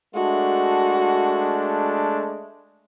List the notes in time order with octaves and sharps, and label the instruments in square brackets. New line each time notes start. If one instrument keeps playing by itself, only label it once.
[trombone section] G#3 A3 D4 [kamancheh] F#4